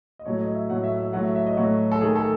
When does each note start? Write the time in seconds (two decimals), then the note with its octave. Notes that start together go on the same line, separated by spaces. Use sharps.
0.19 D#5
0.25 A2 F#3 A3 C#5
0.41 D#5
0.55 E5
0.70 A2 F#3 A3 F#5
0.84 E5
0.98 E5
1.13 A2 F#3 A3 F#5
1.24 E5
1.35 E5
1.46 D#5
1.57 A2 F#3 A3 F#4
1.92 A4
2.01 D#3 A3 G#4
2.16 A4